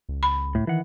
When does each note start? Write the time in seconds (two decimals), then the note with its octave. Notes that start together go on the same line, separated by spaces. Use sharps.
0.09 C#2
0.23 B5
0.55 A2
0.67 D#3 E3 F#5